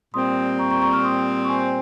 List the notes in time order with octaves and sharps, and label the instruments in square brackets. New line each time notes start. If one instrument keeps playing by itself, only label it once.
[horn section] A#2 G3 C4 [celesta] C6 D#6
[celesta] A#5 C#6
A#5 C#6
A#5 C#6
C#6 F6
C6 D#6
C#6
G#5 C6